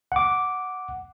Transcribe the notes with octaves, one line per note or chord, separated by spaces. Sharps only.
F#5 D6